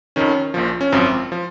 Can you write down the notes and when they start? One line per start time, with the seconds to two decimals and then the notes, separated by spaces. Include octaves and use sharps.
0.16 F2 D#3 C#4
0.54 A#1 A#2 F3
0.81 C#4
0.92 G#1 F#2 F3 C4
1.32 F3